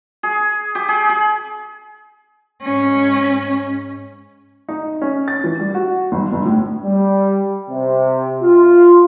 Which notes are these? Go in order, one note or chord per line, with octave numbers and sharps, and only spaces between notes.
G#4
G4
G#4
G#4
G#2 C#4
D#4
C#4
A6
E3
G3
F#4
G1
G1
A2
G3
C3
F4